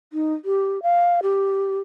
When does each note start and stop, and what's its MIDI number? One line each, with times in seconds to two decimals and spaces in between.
0.13 0.33 63
0.45 0.82 67
0.83 1.20 77
1.23 1.79 67